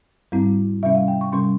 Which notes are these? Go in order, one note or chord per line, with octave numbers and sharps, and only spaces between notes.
G#2 G3 C4 E4
C3 G3 C#4 E5
F5
G5
C#6
C3 G3 C#4 C6